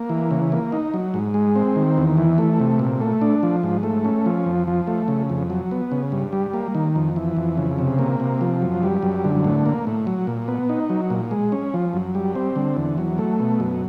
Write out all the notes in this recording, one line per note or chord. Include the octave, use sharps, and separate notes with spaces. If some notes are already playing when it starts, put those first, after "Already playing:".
Already playing: A#3
E3
C#3
A#3
D#4
F#3
G#2
G#3
C4
D#3
E2
E3
A3
C3
A#2
A3
D4
F3
G#2
A3
C#4
F3
F2
F3
A3
C#3
F2
F#3
B3
C#3
G2
G3
A#3
D#3
F2
E3
F2
C#3
C3
A#3
C3
F3
F#2
G3
F#2
D3
A2
A#3
A2
F#3
A#2
B3
D#4
F#3
A#2
G#3
C#4
F3
F#2
G3
C4
D3
E2
F#3
A3
B2
F#2